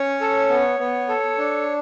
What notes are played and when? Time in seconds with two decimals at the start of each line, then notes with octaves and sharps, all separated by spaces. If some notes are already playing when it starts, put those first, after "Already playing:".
Already playing: C#4 C#5
0.21 A4
0.50 B3
0.79 B3
1.09 A4
1.38 D4